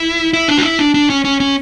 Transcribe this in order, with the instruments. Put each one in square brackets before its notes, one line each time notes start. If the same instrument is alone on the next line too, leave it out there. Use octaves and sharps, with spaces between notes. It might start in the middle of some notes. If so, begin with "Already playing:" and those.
Already playing: [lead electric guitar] E4
E4
D4
F#4
E4
D4
D4
C#4
C#4
C#4